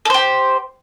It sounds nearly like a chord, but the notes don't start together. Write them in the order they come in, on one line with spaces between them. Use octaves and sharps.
A4 C5 G4